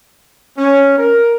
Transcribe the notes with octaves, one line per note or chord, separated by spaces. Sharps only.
C#4
A#4